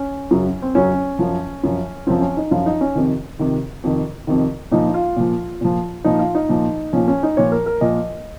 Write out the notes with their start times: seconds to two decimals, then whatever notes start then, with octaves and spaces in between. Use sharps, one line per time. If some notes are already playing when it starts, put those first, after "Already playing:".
Already playing: C#4
0.31 F#2 C#3 F#3
0.62 C4
0.75 F#2 C#3 F#3 C#4
1.19 F#2 F3
1.63 F#2 F3
2.07 F#2 F3 C4
2.21 C#4
2.37 D#4
2.51 F#2 F3 F4
2.66 D#4
2.81 C#4
2.95 F2 C3 D#3
3.39 F2 C3 D#3
3.84 F2 C3 D#3
4.27 F2 C3 D#3
4.71 A#2 F3 D#4
4.89 D#4
4.94 F4
5.16 A#2 F3
5.61 A#2 F3
6.04 A#2 F3 D#4
6.19 F4
6.35 D#4
6.49 A#2 F3
6.93 A#2 F3 C#4
7.08 C#4
7.23 D#4
7.37 A#2 F3 C#5
7.52 A#4
7.66 A#4
7.81 A#2 F3 D#5